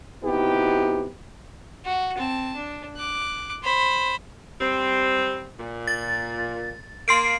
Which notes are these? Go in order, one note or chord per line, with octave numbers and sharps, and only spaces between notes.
C3 B3 D#4 E4 F#4 G4
F#4
C4 A5
D4
D6 F#6
C5 B5
G3 C4
A#2
A6
A#3 C6 C7 D7